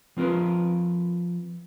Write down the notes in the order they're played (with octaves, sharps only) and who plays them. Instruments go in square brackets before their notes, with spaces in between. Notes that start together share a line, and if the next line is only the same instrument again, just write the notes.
[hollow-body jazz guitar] F3 C4 F4 A#4 B4